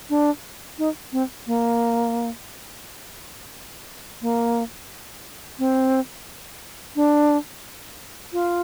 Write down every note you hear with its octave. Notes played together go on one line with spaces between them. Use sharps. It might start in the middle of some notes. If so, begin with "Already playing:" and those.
D4
D#4
C4
A#3
A#3
C4
D4
F4